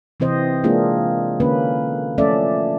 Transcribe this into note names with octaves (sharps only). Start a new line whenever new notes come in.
C3 E3 C4 C5 D#5
G#3 A#3 D4 F4 G#4
D3 A#3 C#4 B4
F3 A3 C#4 A4 D5 E5